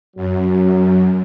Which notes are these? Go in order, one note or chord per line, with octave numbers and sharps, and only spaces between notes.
F#2 F#3